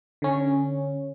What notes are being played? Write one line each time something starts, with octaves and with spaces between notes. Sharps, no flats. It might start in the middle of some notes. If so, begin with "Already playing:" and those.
D3 C#4